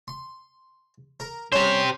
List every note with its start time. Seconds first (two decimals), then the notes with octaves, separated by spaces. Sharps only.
0.08 C6
1.20 A#4
1.52 G3 C#4 G4 C5